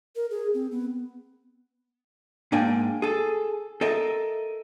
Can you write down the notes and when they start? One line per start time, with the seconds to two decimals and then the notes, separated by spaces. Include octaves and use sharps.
0.16 A#4
0.31 G#4
0.54 C4
0.71 B3
2.52 G#2 A#3 D4 G5 G#5
3.02 G#4 A4
3.81 A4 A#4 D#5 E5